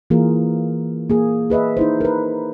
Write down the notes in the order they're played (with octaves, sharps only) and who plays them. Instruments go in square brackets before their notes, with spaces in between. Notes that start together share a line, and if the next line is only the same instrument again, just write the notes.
[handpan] E3 A#3 F4 G#4 A#4
A#3 G#4
G#4 B4 D#5 E5
D#4 E4 C5
A#4 B4